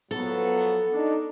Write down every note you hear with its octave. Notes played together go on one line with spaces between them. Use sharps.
F3 F#3 B3 A4
D4 D#4